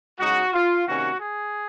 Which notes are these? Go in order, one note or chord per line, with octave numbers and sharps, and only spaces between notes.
C#3 G#3 D#4 F#4
F4
C3 D#3 A#3 C#4 F#4
G#4